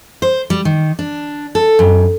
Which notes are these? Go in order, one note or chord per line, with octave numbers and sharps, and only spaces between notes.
C5
G3
D#3
D4
A4
F#2